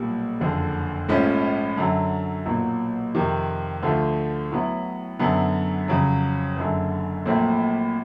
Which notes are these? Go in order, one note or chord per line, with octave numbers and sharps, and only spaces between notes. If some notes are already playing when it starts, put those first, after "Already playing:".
Already playing: B1 A#2 G3
F#1 F2 D3
A#1 G#2 F3 A3 C#4
F#2 D3 F#3
B1 A#2 F#3
F2 C3 D#3
D2 D3 F3 A3
A2 F#3 B3 E4
F#2 D3 F#3 B3
F2 C#3 F#3
F#1 F#2 D3
A#1 A#2 F#3 A3 C4